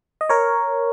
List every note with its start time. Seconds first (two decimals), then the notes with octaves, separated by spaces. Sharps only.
0.21 D#5
0.29 A#4 C#5